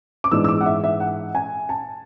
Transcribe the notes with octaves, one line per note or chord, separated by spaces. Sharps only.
D6
G#2 E3 G#3 B3 D4 E6
E6
D6
F#5
E5
E5
F#5
G#5
A5